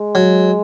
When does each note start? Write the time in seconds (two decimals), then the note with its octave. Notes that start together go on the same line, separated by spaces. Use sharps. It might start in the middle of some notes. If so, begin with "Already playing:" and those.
Already playing: G#3
0.15 F#3